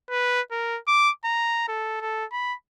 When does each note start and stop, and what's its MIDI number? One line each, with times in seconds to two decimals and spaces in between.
0.10 0.41 71
0.51 0.78 70
0.87 1.10 86
1.25 1.68 82
1.68 1.99 69
2.01 2.25 69
2.32 2.55 83